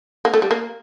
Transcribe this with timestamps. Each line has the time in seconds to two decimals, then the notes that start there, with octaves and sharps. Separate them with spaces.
0.25 A#3
0.34 A3
0.42 G3
0.51 A#3